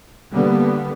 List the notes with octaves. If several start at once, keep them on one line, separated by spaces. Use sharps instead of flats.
D3 G3 A#3 B3